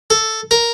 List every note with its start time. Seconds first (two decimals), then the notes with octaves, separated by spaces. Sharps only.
0.10 A4
0.51 A#4